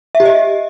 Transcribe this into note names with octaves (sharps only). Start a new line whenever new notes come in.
E5
G4
D#5